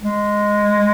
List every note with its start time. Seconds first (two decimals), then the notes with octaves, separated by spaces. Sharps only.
0.01 G#3